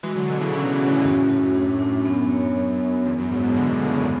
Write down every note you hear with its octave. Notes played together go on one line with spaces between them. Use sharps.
E3 G#3 F#4
D3 F#3
B2 D3 A4
C#3 E3
C#3 E3 C#4
B2 D3
F#4
A2 C#3
F#2 A2 F#4
F#4
D4
D4
F#2 B3
C#5
B3
B3
E2 B3
F#2
E2 G#2 B3
G#2 B2
B2 D3 B3
B2 D3
A2 C#3 B3
E2 G#2